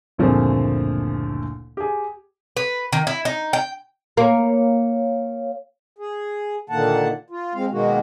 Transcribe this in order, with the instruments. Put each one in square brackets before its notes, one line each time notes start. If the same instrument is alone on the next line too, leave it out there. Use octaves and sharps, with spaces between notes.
[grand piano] F#1 D2 A#2 F3 C4 G#4
G4 G#4
[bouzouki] B4
D#3
E4
D#4
G5
[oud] A#3 [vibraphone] C#5 F5
[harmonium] G#4
A#2 D3 D#3 A#3 F#5 A5
F4
G#3 C4 F5
B2 D#3 G#3 A#3 F#4